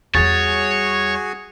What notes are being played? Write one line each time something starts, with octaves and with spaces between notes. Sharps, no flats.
E2 G3 F#4 G#4 C#5 G#5 A6